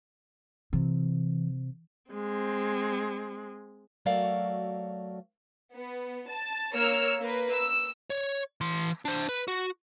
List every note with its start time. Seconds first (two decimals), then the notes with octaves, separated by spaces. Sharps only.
0.73 C3 E3
2.11 G#3 C4
4.06 F#3 A3 F#4 A#4 D5 F5
5.74 B3
6.29 A5
6.72 A#3 C#5 E6 F6
7.19 A#3 B4
7.54 E6
8.10 C#5
8.61 E3 C6
9.05 D4 C5
9.29 B4
9.48 F#4